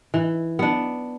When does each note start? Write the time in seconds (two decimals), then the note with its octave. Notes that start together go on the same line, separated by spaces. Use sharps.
0.14 E3
0.59 B3 D4